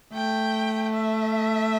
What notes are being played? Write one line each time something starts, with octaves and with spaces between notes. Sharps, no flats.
A3 G5
E5